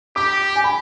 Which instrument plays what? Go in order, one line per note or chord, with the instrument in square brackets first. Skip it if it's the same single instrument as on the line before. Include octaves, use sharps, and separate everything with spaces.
[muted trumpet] G4 [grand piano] D6
[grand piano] G#5
B5